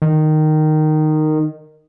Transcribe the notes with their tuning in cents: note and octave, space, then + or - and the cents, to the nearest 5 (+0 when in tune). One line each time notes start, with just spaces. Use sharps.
D#3 -10